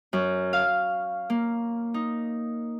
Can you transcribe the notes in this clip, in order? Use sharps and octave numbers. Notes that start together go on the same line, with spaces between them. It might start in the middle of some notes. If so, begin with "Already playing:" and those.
F#2
F5
A#3
D#4